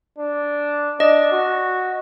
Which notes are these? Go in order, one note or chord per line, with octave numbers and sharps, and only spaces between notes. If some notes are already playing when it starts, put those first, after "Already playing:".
D4
D4 D#5
F#4